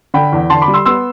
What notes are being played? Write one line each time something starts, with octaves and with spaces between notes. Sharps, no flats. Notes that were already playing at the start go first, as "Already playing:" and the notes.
D3 G5 B5
E2
D3 A5 C6
B5 D6
G3
C6 E6
B3 C6 E6